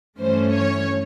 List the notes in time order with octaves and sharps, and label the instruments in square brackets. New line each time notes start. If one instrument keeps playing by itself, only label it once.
[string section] G2 E3 A3 C#4 C5
C#5